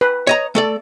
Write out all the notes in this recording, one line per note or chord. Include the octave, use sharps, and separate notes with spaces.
B4
C#5 D#5 A#5
A3 A4 D5